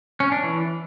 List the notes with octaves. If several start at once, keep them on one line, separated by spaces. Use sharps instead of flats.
C#4
D4
E3